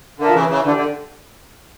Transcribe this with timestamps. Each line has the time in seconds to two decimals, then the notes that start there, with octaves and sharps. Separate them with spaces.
0.19 D3 A#4 E5 A5
0.28 F3
0.34 C#3 E3
0.50 C#3 E3
0.64 D3 D4 G4 D5
0.76 D3